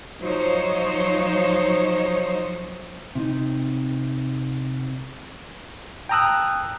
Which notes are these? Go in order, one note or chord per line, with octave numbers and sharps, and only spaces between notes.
F3 F#3 D#4 C5 C#5
C3 D#4
G5 A5 A#5 D#6 E6 F#6